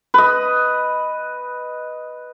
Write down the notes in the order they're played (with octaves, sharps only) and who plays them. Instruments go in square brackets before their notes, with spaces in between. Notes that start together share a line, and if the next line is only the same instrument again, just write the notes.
[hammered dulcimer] B4 D#5